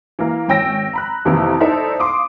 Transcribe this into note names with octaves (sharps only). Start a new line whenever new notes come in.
E3 A#3
G#1 C#4 G5 E6 A#6 D7
A#5 B5 F#6
F2 C3 D#3 E3 A#3 E4
D#4 E4 A4 C5 D5 E5
F5 C6 D6 D#6